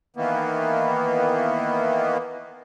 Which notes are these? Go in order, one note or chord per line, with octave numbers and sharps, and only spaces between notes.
D#3 E3 A#3 B3